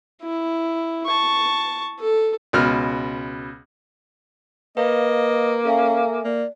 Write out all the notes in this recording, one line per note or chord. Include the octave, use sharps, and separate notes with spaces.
E4
A5 C#6
A4
C#2 B2 F6
A#3 B4 D#5 F5
C#4 A4 E5 F5 G#5
A#3 D5